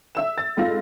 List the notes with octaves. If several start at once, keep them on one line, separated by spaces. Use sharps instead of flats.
E5 E6 E7
A6
F2 G#2 F4 A#6